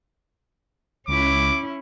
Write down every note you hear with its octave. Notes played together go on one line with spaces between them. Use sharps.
C#2 C#4 E4 D6